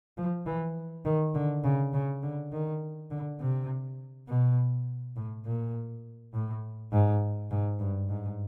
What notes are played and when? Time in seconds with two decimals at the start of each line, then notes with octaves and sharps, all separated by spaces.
0.17 F3
0.46 E3
1.05 D#3
1.35 D3
1.64 C#3
1.94 C#3
2.23 D3
2.52 D#3
3.11 D3
3.40 C3
4.28 B2
5.16 A2
5.45 A#2
6.34 A2
6.92 G#2
7.51 G#2
7.79 G2
8.09 G#2